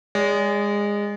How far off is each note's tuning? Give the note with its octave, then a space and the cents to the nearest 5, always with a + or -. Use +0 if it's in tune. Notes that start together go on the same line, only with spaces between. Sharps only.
G#3 -20 D5 -45